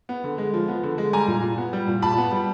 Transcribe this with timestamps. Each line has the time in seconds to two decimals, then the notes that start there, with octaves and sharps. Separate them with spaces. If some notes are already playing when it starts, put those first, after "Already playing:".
0.09 B3
0.24 D3
0.38 G#3
0.54 F3
0.68 B3
0.83 D3
0.98 G#3
1.13 G3 G#5 A#5
1.28 A#2
1.42 A#2
1.58 B3
1.73 G3
1.87 A#2
2.02 A#2 A5 B5
2.18 B3
2.32 G3